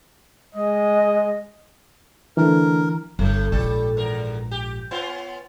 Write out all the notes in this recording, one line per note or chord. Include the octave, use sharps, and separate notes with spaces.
G#3 D#5
D3 E3 A3 A#4
G1 A2 A3
A#1 G#2 G3 A4
E2 A#4
G4
B3 C#4 F4